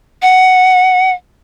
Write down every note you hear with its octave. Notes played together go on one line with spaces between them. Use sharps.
F#5